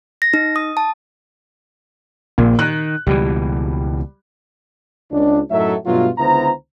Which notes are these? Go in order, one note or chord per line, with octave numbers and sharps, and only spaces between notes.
A#6
D#4
D#6
A5
A#1 A#2
D#3 F#6
C#2 B2 E3 G3
C#2 D4
F#2 A2 F#3 D#4 A4 E5
G2 B2 F#3 A3 F4
C#2 D3 B3 E4 C5 A#5